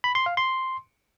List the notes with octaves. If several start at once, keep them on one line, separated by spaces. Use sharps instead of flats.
B5
C6
F5
C6